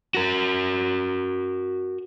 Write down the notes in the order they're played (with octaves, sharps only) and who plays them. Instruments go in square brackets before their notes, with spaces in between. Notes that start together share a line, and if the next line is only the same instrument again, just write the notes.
[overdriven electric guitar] F#4 A#4